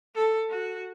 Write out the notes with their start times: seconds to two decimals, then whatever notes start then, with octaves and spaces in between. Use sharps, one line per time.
0.15 A4
0.49 F#4